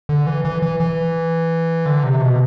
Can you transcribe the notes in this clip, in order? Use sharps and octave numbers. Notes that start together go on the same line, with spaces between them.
D3
E3
E3
E3
E3
D3
C3
B2